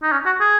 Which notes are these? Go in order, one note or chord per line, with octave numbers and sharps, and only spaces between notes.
D#4
C#4
F#4
G#4